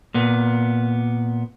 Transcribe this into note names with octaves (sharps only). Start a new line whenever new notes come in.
A#2 B3